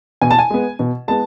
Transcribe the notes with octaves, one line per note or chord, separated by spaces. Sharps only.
B2 G#5
A5
G#5
G#3 B3
B2
G#3 B3 A5